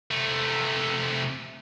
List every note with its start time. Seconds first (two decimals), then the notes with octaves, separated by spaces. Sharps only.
0.11 C3 A3